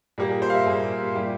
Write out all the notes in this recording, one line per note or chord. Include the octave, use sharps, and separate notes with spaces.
A#2 G3 A#3 G4
G#4
C5
F5
E5
A#2 G3 A#3 G#4
A#2 G3 G4